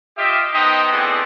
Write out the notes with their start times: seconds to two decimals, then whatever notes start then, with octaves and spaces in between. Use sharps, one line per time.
0.17 F4 G4 D#5 E5
0.54 B3 D#4 C5 D#5 G5
0.91 A3 B3 C4 D4 E4 G#4